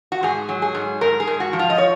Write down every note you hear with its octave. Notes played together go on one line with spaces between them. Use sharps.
F#4
G#2 G#4
F#3
G#4
G#2
G#2 A#4
G#4
G#2
F#4
F3
F4
D#5
C#5